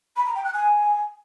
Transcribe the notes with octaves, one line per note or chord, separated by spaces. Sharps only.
B5
A#5
G5
F#6
G#5